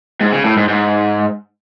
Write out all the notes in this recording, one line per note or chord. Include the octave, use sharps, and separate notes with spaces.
G#2
C#3
A2
G#2
G#2